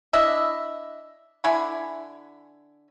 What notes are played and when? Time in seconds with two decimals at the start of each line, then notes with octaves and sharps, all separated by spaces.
0.13 D4 E4 D#5 E5
1.44 D3 E4 G#5 B5